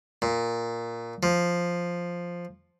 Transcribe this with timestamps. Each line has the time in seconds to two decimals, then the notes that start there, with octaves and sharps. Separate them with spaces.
0.22 A#2
1.23 F3